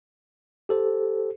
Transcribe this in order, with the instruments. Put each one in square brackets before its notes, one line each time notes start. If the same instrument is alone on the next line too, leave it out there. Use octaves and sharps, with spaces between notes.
[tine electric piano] G4 A4 C5